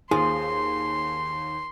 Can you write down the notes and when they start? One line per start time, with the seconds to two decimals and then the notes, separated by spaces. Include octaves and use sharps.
0.11 D#2 F3 G#4 C6